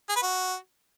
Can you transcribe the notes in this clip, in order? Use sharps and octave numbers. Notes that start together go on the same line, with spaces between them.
G#4
B4
F#4